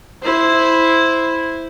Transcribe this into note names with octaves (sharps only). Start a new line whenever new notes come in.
E4 C5